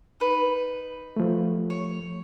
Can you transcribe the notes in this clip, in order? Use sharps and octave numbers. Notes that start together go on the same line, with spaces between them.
D#4 B4
F3 A3
C#5